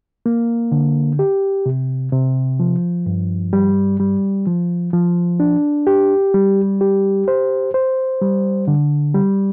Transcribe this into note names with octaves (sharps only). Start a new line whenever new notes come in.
A#3
D3
G4
C3
C3
F3
G2
G3
G3
F3
F3
D4
G4
G3
G4
C5
C5
G3
D3
G3